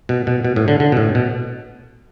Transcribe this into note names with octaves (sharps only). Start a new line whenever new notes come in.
B2
B2
B2
A2
D3
D3
B2
A2
B2